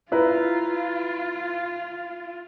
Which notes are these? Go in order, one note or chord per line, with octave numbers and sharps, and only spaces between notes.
E4 F4 B4 A#5